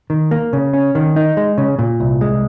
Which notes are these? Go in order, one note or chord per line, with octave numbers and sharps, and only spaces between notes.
D#3
A#3
C#3
C#4
D#3
D#4
G#3
C#3
A#2
C2
G#3